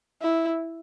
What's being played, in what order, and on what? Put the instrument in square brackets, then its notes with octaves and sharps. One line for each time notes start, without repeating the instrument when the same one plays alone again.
[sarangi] E4